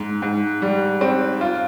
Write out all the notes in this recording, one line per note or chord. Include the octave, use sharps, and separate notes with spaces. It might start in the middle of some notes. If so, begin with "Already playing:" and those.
Already playing: G#2
G#2
G3
C4
F4